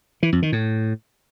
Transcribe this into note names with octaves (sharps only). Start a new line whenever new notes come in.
E3
F2
D#3
A2